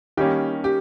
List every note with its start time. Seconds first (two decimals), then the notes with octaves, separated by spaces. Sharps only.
0.17 D#3 G3 A#3 C#4 G4
0.64 G4